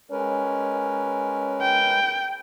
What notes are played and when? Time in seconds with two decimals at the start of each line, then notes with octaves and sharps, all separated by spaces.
0.11 G#3 C#4 A#4 B4
1.62 G5